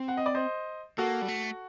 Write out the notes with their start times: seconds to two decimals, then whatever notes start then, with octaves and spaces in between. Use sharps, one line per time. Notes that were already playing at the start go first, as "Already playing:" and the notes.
Already playing: C4
0.08 F#5
0.17 D#5
0.26 D5
0.35 C5 D#5
0.98 A#3 F#4 A4
1.22 G3
1.28 A3